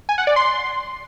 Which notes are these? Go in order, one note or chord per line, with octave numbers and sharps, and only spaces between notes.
G#5
F#5
D5
C6